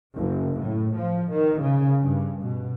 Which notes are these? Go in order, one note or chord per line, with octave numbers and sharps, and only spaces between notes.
F#1
A2
F3
D#3
C#3
G2
B2